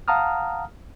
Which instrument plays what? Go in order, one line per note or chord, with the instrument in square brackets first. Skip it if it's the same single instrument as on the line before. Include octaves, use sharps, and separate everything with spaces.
[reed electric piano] F5 F#5 A5 A#5 D#6 F6